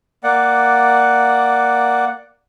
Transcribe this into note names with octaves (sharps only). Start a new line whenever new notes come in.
A#3 D5 F#5